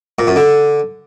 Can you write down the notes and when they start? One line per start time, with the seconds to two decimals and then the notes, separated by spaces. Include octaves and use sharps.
0.19 A#2
0.27 F#2
0.36 D3